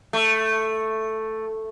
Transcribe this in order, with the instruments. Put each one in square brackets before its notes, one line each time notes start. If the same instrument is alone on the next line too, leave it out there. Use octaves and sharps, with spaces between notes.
[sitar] A3